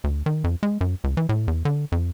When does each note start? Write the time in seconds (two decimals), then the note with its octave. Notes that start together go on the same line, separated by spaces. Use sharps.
0.04 D2
0.26 D#3
0.44 F2
0.63 G#3
0.81 F#2
1.04 C#2
1.17 E3
1.29 A2
1.48 E2
1.65 D3
1.92 F2